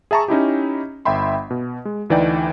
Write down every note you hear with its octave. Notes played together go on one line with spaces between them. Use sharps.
G#4 E5 A5 A#5 C#6
C#4 D#4 E4 G4
G1 E5 G5 B5 C6
B2
G#3
D2 E3 D#4 D5 G5